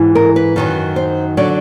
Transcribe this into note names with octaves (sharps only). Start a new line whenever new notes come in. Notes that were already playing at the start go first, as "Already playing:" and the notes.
Already playing: G#2 E3
A#4
B4
F#2 D#3 F#3
C5
D3 F#3 D5